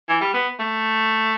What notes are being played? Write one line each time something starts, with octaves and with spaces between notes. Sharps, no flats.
E3
G3
B3
A3